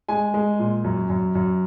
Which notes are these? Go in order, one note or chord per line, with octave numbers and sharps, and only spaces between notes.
G#3 G#5
G#3
A#2
F#2
F#2
F#2